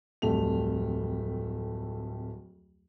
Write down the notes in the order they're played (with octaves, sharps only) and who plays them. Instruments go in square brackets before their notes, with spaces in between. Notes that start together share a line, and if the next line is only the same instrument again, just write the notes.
[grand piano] D1 F2 G3 A3 F7